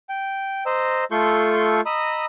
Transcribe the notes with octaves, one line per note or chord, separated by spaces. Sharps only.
G5
C5 D#5 A#5 E6
A3 F4 A4 C6 C#6 G6
D#5 A#5 B5 D#6 E6